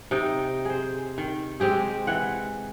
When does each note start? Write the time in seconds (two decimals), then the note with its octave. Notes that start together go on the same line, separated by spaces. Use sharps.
0.11 C3 D#4 G5
0.65 G#4 C5
1.18 D#3
1.60 G#3 C4 G4 G#4
2.07 E3 F#5